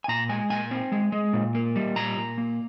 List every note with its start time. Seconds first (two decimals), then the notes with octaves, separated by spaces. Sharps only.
0.04 G#5
0.08 A#2 A#5
0.29 G#3 G#5
0.50 A#2 G#5
0.71 C4
0.92 G#3
1.12 G#3
1.33 A#2
1.55 A#3
1.76 G3
1.96 A#2 A#5
2.17 A#2
2.38 A#3